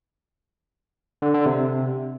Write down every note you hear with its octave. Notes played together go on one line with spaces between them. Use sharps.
D3
D3
C3